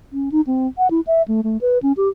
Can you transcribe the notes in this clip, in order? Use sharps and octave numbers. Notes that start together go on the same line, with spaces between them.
C#4
D#4
C4
F#5
E4
E5
A3
A3
B4
C#4
G4